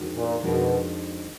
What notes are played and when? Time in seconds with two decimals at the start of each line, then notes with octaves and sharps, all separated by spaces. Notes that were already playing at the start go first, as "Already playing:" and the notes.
Already playing: F2 D#3 G#3 D4 F#4
0.15 A#2
0.43 F2 B2 D#3 G#3 D4 F#4